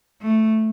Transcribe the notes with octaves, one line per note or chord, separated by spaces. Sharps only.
A3